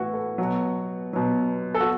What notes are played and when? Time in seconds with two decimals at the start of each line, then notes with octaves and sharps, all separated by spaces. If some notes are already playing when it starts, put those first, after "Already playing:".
Already playing: A2 E3 E4 F#4
0.14 A4
0.38 B2 F#3 F#4
1.13 B2 F#3
1.75 A4
1.80 F#4